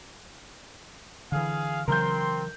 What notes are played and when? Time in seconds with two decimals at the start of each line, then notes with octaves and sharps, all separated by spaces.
1.32 D3 E3 G#4 F5
1.88 C#3 E3 F#3 C4 A#4 C6 G6